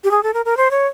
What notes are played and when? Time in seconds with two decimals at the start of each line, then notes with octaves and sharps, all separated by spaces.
0.04 G4
0.11 G#4
0.23 A4
0.34 A#4
0.45 A#4
0.57 C5
0.71 C#5